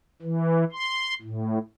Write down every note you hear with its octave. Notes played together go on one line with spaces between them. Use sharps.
E3
C6
A2